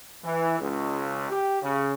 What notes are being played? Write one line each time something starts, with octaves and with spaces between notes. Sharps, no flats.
E3
C#2
G4
C#3